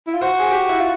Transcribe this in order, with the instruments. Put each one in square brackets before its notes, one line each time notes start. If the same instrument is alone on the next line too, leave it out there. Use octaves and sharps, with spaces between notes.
[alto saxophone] E4
F4
[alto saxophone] F#4 [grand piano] C5
[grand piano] G#4
G4
E4
F4